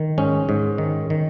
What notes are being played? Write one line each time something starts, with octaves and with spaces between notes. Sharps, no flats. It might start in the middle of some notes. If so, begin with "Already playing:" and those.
Already playing: D#3
G#2 C#4
G#2
D#3
D#3